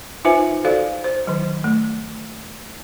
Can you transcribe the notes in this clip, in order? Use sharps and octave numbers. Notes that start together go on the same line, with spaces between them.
D#4 F4 B4 C5 E5 G#5
F#4 A4 C5 D5 F5
C5
D#3 F#3
A3